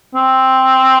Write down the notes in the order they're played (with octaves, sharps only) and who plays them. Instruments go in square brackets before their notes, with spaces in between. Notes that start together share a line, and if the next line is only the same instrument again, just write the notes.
[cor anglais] C4